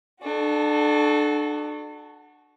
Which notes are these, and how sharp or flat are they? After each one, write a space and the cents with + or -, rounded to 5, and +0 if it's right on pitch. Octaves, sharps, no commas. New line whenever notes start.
D4 +30 F#4 +0 A4 -25